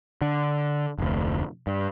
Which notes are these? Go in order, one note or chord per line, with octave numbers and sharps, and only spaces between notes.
D3
F1 D2
G2